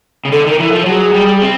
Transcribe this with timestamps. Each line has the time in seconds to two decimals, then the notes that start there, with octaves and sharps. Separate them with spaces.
0.25 C#3
0.32 D3 A4
0.46 D#3 A#4
0.60 E3
0.69 A4
0.73 F3
0.86 F#3 G#4
1.14 G3
1.42 C4